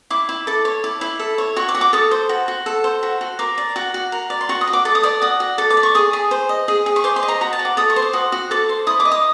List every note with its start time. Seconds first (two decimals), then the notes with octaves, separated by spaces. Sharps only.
0.10 E4 D6
0.29 E4
0.47 A4 D6
0.65 C#5
0.84 E4 D6
1.01 E4
1.19 A4
1.38 C#5
1.56 F#4 C#6
1.69 D6
1.75 F#4
1.81 D6
1.93 A4 D#6
2.11 C5
2.29 F#4
2.48 F#4
2.66 A4
2.84 C5
3.03 F#4
3.21 F#4
3.39 A#4 D6
3.58 D5
3.76 F#4
3.94 F#4
4.12 A#4
4.30 D5
4.41 C6
4.49 F#4 C#6
4.61 D#6
4.67 F#4
4.73 D6
4.85 A4 D6
4.95 D#6
5.03 D5 D6
5.22 F#4 D#6
5.40 F#4
5.58 A4 D6
5.70 D6
5.77 D5
5.83 C#6
5.95 G#4 D#6
6.13 G#4
6.31 C5
6.49 D#5
6.68 G#4
6.86 G#4
6.96 C#6
7.04 C5 D6
7.16 C6
7.23 D#5
7.28 A#5
7.41 F#4 A#5
7.53 A5
7.59 F#4
7.65 D6
7.77 A4 D#6
7.90 C#6
7.96 C5
8.02 D6
8.13 F#4 D#6
8.32 F#4
8.51 A4 D6
8.69 C5
8.87 E4 D#6
9.00 D6
9.05 D#5
9.12 D#6